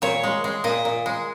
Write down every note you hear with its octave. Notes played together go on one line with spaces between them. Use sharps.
A#2 C#5
G#3
G#3
A#2 D#5
A#2
G#3